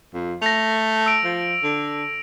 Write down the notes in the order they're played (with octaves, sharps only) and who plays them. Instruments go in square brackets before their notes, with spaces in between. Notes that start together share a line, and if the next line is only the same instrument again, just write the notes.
[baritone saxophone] F2
[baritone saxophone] A3 [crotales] A#6 F7
[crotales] E6 D7
[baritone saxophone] F3
D3